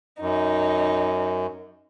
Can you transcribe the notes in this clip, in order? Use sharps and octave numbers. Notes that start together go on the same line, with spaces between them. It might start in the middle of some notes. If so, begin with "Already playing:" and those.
F#2 D#4